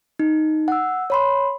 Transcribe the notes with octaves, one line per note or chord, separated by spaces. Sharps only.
D#4
F#5 E6
C#5 B5 C6